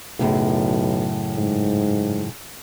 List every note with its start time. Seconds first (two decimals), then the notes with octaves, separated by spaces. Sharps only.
0.19 B1 F#2 A2 C#3
1.37 G#2